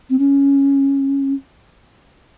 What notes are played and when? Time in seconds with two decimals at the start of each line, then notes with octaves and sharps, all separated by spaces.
0.10 C4
0.19 C#4